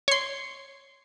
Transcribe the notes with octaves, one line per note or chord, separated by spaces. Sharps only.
C#5 C6